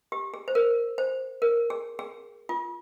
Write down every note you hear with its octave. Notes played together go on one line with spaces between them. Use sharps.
G4
G#4
C5
A#4
C5
A#4
G#4
G#4
F4